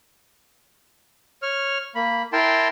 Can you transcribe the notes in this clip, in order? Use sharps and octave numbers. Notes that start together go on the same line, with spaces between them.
C#5 F6
A#3 B5
E4 A#4 G5 A5 C6